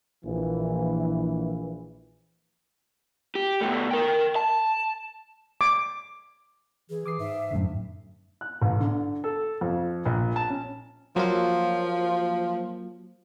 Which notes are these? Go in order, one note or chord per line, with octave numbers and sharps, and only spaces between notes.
A#1 E3
G4
B2 A3
A#4 G5
A5
D6
E3 G#4
E3 D6 D#6 C7
G#2 E5
F#2 A2 D3
F#6
A1
D3
A4
F2
A#1
A5
C#4
F3 F#3 A#3 F4